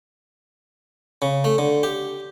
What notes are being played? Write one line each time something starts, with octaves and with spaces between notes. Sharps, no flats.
C#3
A3
D3
G4